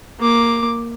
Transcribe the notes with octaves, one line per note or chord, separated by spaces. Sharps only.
A#3 D6